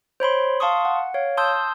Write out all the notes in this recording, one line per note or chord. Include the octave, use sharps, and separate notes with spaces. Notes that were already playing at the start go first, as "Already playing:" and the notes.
C5 C#5 B5 C6
F5 A5 C6 C#6 D#6
F#5
C#5 F5
A5 C6 D#6 E6 G6